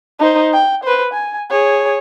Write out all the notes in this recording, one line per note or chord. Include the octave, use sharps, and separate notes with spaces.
D#4 C5
G5
B4 C5
G#5
G#4 C#5